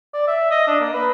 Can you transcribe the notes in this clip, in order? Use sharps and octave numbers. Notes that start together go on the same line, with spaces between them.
D5
E5
D#5
D4
A#3
B4